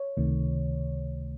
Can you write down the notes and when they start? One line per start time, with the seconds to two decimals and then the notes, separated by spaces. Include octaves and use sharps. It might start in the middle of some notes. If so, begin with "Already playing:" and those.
Already playing: C#5
0.17 C#2 C3 D#3 A3